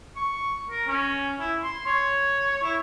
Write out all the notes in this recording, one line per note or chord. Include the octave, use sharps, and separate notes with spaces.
C#6
A#4
C#4
E4
C6
C#5
E4